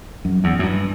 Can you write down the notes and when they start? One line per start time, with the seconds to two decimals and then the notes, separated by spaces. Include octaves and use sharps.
0.25 F#2
0.44 E2
0.59 F#2
0.64 G2